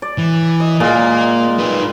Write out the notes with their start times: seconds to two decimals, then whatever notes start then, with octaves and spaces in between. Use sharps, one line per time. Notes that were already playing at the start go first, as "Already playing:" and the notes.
0.02 D5
0.18 E3
0.60 D#5
0.80 A#2 G#3 A#3
1.59 D#4 B4